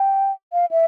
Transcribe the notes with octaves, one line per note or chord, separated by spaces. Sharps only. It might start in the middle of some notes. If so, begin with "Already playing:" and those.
Already playing: G5
F5
E5